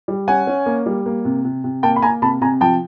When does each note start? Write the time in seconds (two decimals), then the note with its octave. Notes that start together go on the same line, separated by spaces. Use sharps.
0.08 G3
0.28 C#4 F#5 G#5
0.47 C#4
0.66 A#3
0.86 G3
1.06 A#3
1.25 C3
1.45 C3
1.64 C3
1.83 A#3 G5 A5
1.96 B5
2.02 A#3 G#5 A#5
2.22 C3 A5 B5
2.41 C3 G#5 A#5
2.61 F3 G5 A5